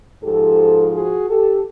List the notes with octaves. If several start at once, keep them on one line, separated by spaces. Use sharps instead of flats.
G#2 F3 G4 A4
F#4 G#4
G4 A4